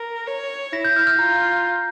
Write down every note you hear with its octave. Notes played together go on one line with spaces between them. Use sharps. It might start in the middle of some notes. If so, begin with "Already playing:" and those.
Already playing: A#4
C#5
E4 A#6
G6
F6
F6
F4 A#5